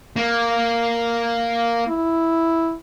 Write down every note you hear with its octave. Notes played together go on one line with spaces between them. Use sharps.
A#3
E4